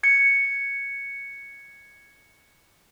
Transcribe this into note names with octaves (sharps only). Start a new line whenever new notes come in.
G#6 C#7